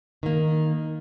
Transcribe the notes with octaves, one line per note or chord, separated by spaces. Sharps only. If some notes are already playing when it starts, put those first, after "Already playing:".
D#3 A#3